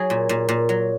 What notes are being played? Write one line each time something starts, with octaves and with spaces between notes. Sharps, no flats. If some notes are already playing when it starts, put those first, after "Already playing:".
Already playing: F#3 G#4
A#2
A#2
A#2
F#3